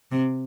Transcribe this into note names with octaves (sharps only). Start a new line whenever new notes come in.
C3